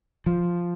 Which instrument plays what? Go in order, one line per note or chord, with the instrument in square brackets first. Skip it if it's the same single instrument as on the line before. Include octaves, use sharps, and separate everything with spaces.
[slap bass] F3